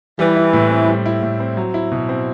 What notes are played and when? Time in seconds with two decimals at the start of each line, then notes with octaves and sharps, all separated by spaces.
0.19 E3 G3
0.36 E4
0.53 A2
0.70 C4
0.88 G3
1.06 E4
1.22 A2
1.40 C4
1.57 F#3
1.74 E4
1.92 B2
2.09 C4